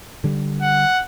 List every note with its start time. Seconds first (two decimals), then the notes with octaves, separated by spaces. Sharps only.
0.24 D3 G3
0.62 F#5